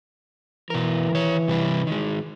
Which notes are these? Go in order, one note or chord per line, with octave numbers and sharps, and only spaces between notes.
B2 E3 A#4
D#3 C#5
C3 G3 B4
D#3 G#3